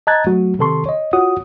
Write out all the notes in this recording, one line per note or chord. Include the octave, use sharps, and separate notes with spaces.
D#5 A5 A#5 F#6 G#6 A6
F#3 A3 F#4
C3 D#3 A4 A5 C6 C#6
C#5 D#5
F4 F#4 C#5 F#5 D#6